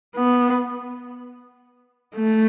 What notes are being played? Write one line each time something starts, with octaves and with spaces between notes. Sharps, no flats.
B3
A3